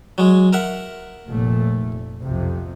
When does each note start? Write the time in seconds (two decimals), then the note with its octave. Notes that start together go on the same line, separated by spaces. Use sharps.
0.18 F#3 G#3
0.53 A#4 E5 F#5
1.28 F1 A#2 A3
2.22 B1 F2 C3